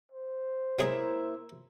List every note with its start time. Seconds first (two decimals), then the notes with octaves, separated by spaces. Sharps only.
0.11 C5
0.79 F#3 G#3 A#3 E4 G#4 E5